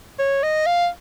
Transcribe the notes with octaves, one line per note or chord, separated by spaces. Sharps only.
C#5
D#5
F5